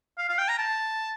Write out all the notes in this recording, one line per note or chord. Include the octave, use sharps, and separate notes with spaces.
F5
F5
G5
A#5
A5